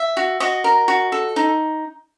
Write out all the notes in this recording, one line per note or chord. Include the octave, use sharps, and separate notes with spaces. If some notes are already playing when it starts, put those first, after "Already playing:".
Already playing: E5
F#4
F#4 D#5
A#4
F#4
A4
D#4